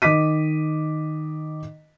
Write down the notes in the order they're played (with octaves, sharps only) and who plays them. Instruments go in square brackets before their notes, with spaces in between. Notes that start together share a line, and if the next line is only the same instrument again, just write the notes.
[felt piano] D#3 D#5 D6 B6 D#7